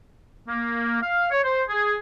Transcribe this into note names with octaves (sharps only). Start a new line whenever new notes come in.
A#3
F5
C#5
C5
G#4